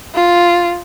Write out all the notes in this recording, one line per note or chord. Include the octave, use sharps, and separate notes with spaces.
F4